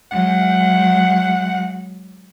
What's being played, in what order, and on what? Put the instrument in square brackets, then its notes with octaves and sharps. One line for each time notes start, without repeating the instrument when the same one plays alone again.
[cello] F#3 G#3 [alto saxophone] F#5